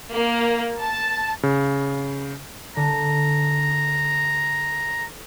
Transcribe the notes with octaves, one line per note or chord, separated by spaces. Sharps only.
A#3
A5
C#3
D3 A#5